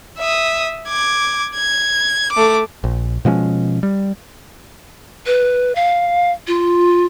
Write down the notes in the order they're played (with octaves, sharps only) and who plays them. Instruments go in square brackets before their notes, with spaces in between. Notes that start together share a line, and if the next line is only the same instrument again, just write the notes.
[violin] E5 D#6
D6 G#6
G#6
A3 D6
[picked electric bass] A#1
B2 F3 G#3 C#4
G3
[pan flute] B4
F5
F4